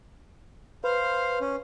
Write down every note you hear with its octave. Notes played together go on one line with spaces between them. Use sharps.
B4 C5 F5
C#4